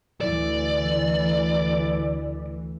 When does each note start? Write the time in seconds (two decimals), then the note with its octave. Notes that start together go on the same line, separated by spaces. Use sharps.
0.21 D2 E3 D5